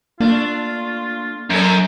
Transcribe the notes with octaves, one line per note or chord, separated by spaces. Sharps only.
A3 A#3 D4 F4
F#2 A#2 C#4 A4